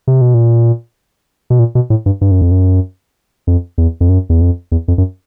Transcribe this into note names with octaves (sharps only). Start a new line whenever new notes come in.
C3
B2
A#2
B2
A#2
B2
A2
G2
G2
F#2
F2
F#2
F2
E2
F2
F#2
E2
F2
E2
F2
F#2